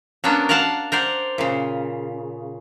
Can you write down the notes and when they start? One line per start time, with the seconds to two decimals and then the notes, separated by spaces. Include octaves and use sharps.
0.24 F#3 A#3 B3 C#4 D4
0.49 A#4 D5 F5 F#5 A5
0.92 A#4 C5 D5 F#5
1.38 A#2 C#3